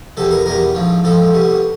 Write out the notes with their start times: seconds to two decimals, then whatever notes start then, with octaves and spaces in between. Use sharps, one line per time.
0.17 E2 B2 G3 A4
0.31 A#4
0.46 E2 B2 G3 A#4
0.75 A1 G#2 F3
1.04 A1 G#2 F3 A4
1.33 C2 B2 G3